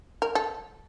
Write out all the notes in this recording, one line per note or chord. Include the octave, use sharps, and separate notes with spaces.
A#4
A4